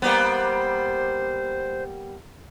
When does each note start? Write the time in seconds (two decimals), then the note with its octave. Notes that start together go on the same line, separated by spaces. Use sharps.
0.02 G3 A#3 B3 C5